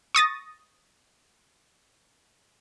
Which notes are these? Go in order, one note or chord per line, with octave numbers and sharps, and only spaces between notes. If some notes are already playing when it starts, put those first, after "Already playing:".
C#6 D#6 A6 A#6